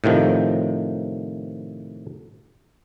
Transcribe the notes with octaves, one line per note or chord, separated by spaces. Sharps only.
A2 C3 D#3 F3